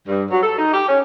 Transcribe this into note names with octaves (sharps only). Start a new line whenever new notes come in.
G2
F#3
A4
D#4
G4
C#4